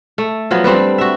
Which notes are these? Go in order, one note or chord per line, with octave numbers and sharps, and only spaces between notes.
A3
F3 F#3 B3
G3 C4 D4 B4
F#4 E5